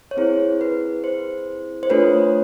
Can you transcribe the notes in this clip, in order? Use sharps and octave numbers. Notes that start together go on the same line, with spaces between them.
C#5
C4 E4 G#4 C5
B4
C5
C5
A3 D4 F4 A4 B4 C#5